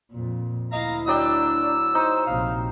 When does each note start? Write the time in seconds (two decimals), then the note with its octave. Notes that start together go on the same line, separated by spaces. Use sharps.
0.12 F2 A#2
0.73 D2 E4 D#5 F5 A#5
1.08 F#3 D4 D5 G5 E6
1.95 D#4 C5
2.26 A#1 C3 F5